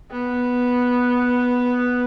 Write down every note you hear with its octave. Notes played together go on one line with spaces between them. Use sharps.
B3